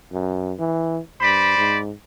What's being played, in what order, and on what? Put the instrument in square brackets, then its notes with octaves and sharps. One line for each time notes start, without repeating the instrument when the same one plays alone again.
[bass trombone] F#2
E3
[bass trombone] G2 [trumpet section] C5 D5 B5
[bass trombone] G#2